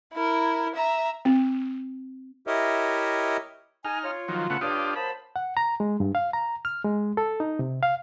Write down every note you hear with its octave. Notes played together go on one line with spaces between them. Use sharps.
E4 A#4
E5 A#5
C4
E4 G4 A#4 C#5 D#5 E5
D#4 G#5 F6
F4 C#5
D#3 F3 F#3
C#3 A3 B3 F#5
G2 D4 F4 G4 C#5 D#6
F#3 A#3 C5 A5 B5
F#5
A#5
G#3
G2
F5
A#5
F6
G#3
A4
D#4
C3
F5